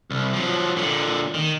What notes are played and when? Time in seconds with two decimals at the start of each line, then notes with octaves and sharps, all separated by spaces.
0.11 C2
0.34 F3 F#3
0.76 A#2 D3
1.34 D#3